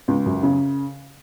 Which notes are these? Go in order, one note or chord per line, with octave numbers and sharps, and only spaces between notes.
C#2
F#2
C#3